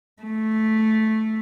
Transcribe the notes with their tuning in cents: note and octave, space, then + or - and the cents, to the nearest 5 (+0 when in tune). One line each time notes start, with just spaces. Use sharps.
A3 -5